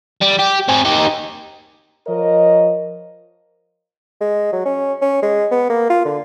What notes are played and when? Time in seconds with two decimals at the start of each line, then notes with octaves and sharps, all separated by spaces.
0.21 G3
0.39 G4
0.68 C4 G#4
0.85 D#4 G4
2.07 F3 A#4 C#5 D#5
4.21 G#3
4.52 F#3
4.65 C#4
5.01 C#4
5.22 G#3
5.51 B3
5.70 A#3
5.90 F4
6.05 D3